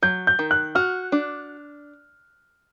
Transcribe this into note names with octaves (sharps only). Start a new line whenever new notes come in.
F#3 G6
G6
D#3
F#6
F#4 F6
D4